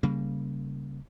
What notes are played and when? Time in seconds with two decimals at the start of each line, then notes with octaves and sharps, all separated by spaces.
0.03 C#3 G3 A#3